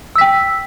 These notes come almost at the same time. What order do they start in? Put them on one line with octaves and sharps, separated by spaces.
E6 B6 G5